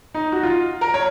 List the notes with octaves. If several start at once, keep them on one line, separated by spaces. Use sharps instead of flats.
D#4
F#4
F4
A#4
C#5